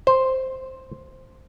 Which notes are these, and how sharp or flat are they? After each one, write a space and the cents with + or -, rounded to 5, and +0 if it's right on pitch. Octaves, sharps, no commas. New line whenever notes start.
C5 +0